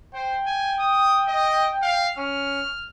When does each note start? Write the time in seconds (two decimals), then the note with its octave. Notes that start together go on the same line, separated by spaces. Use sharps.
0.14 C5 G5
0.46 G#5
0.80 D#6
1.28 D#5
1.82 F5
2.18 C#4 F6